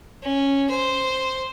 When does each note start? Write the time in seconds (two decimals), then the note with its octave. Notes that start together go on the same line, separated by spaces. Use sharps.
0.23 C#4
0.70 C5